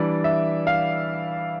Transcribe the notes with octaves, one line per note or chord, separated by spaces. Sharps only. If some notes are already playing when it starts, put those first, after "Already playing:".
Already playing: E3 G3 D4 D5
E5
F5